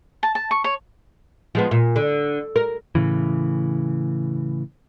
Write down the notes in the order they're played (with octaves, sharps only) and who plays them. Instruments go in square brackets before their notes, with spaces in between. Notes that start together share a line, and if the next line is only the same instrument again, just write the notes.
[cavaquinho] A5
A5
C#6
C#5
[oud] F3 G#3 B3
A#2
D3
A#4
[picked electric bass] A2 C#3 E3